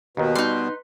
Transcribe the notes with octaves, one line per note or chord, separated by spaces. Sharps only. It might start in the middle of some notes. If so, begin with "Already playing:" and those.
D#2 B2 D#3 B4
G3 D#4 C6